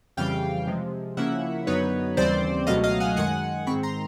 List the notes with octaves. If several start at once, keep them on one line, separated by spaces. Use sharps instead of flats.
F2 C#3 E3 G3 F5 G5
C3 F3 G#3
C#3 F3 A#3 C#4 E4 E5 F#5
F#2 D3 F#3 B3 D#4 B4 C#5
D#2 C#3 E3 G3 C4 C5 D5
C#2 B2 F#3 A3 D#5 F5
D#5 F5
F#5 G#5
F#2 D#3 G#3 F#5 G#5
G#2 D#3 G#3 C4 B5 C#6
A#5 C6